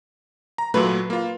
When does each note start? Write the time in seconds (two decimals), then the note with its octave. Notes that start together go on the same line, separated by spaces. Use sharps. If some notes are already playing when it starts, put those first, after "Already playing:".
0.58 A#5
0.74 A#2 F#3 A3 B4
1.10 A#3 F4